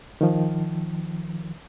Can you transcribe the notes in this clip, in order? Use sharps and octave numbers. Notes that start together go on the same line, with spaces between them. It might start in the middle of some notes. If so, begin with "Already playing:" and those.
D#3 F3